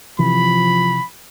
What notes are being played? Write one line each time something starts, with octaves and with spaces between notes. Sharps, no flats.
C3 E3 F3 B5